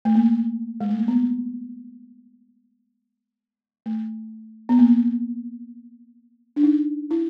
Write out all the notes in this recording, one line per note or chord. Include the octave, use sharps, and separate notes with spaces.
A3
A#3
G#3
A3
A#3
B3
A3
B3
A#3
D4
D#4
E4